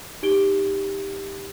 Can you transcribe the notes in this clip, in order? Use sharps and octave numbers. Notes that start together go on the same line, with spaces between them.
D#4 G4 D7 G7